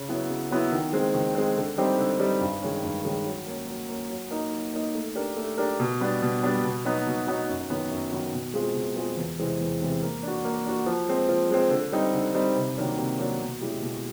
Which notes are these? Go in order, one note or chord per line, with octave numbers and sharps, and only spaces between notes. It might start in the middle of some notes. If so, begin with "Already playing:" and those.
Already playing: C#3
F#3 B3 E4
C#3
F#3 B3 E4
D#3
G#3 C4
D#3
G#3 C4
D3
G3 C4 D#4 G4
D3
G3 C4 D#4 G4
G2
D#3 G#3 C#4
G2
D#3 G#3 C#4
F#3
A#3 C#4
F#3
A#3 C#4
F#3
A#3 D#4
F#3
A#3 D#4
A3
D4 G4 A#4
A3
D4 G4 A#4
B2
G3 B3 D4
B2
G3 B3 D4
B2
F#3 B3 D#4
B2
F#3 B3 D#4
F#2
D#3 F#3 B3
F#2
D#3 F#3 B3
B2
G#3 C4 F4 G#4
B2
G#3 C4 F4 G#4
E2
C3 E3 G#3 C4
E2
C3 E3 G#3 C4
A#3
D4 F#4
A#3
D4 F#4
F3
G#3 C4
F3
G#3 C4
D3
G3 C4 D#4
D3
G3 C4 D#4
C3
D#3 F#3 A#3 D4
C3
D#3 F#3 A#3 D4
B2
G#3 C#4 E4 G4
B2